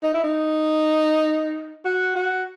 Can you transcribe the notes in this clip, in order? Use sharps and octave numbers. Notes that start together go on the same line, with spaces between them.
D#4
E4
D#4
F#4
F#4